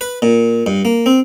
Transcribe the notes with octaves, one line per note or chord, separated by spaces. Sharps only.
B4
A#2
G2
A#3
C4